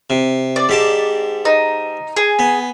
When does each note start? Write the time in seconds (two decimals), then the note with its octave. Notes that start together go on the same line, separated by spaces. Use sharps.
0.10 C3
0.56 D5
0.69 G#2 G4 A5
1.45 D#4
2.17 G#4
2.39 B3